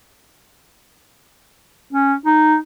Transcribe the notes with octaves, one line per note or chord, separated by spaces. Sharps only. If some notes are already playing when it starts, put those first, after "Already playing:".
C#4
D#4